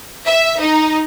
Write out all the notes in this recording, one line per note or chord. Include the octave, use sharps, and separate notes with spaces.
E5
D#4